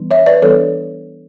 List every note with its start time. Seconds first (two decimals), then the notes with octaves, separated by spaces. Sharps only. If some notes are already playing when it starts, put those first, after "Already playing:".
Already playing: E3 G3 B3 D4
0.11 C#5 E5
0.26 B4 D5
0.42 E3 G3 B3 D4 A4 C#5